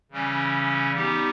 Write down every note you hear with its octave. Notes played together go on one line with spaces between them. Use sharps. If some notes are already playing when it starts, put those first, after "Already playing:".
C#3 E3 G3 C#4
G3 B3 D#4 G4